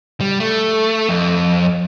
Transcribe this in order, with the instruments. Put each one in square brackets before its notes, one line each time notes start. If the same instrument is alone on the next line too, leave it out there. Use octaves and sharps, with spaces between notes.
[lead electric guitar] G3
A3
F2